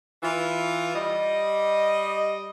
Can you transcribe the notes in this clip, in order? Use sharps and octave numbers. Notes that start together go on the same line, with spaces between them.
E3 F4
G3 D#5